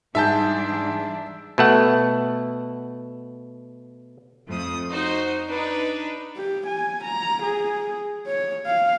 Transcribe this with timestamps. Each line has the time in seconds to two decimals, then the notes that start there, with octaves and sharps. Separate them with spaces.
0.15 G#2 E3 G3 D4 G#4 E5 A5 G6
1.58 B2 A3 F#5
4.48 F2 F3 A3 D#6
4.90 D#4 F#4 C5
5.49 D4 D#4 B4
6.37 G4
6.67 G#5
7.04 A#5
7.43 G#4
8.27 C#5
8.66 F5